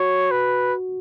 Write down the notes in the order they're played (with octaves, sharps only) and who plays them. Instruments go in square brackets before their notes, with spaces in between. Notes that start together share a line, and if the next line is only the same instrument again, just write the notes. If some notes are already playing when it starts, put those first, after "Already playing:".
Already playing: [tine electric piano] F#4 [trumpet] C#5
[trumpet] B4